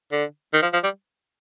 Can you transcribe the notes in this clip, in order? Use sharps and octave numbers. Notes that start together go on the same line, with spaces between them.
D3
D#3
F3
F3
G3